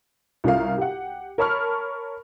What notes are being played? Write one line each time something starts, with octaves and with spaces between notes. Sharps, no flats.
C2 C#4 F4 A#4 F5
G4 F#5
A#4 C#5 A5 B5 C#6 F6